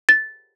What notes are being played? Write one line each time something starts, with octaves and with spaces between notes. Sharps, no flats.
A6